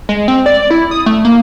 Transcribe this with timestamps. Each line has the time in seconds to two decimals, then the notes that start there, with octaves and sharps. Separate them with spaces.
0.09 G#3
0.28 C4
0.46 D5
0.70 E4
0.91 D#6
1.06 A3
1.25 A#3